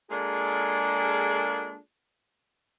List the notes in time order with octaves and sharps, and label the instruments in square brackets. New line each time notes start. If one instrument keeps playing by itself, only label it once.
[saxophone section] G#3 A#3 D4 F4 G#4 A4